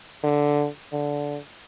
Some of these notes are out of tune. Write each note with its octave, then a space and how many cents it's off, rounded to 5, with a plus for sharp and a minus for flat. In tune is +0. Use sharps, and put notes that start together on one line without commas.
D3 -5
D3 -15